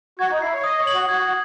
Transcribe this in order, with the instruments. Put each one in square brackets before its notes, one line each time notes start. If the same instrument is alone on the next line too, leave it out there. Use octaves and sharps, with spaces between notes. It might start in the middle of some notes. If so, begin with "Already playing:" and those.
[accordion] F#4 [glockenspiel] G#6
[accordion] D#4
[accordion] E4 [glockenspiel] C7
[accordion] C#5
[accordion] D#5 [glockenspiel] D#6
[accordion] C#5
[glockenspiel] F#7
[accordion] F#4
[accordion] F#4 [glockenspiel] G#6